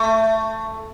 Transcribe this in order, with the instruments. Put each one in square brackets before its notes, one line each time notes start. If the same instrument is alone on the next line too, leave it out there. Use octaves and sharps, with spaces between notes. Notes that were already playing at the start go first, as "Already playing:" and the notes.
Already playing: [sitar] A3